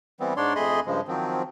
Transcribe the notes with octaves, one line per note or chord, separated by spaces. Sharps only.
E3 G3 B3 C4
G#2 D4 C#5 D5 C6
F2 A3 G#4 D#5 B5 C6
G2 C#3 F3 G#3
D#3 F3 F#3 C4